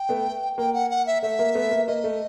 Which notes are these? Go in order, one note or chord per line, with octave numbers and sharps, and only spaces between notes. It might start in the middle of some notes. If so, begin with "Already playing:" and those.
Already playing: G5
A3 B3
A#3 G5
F#5
F#5
E5
A3 E5
A#3
A3 B3
A#3
A#3 D#5
A3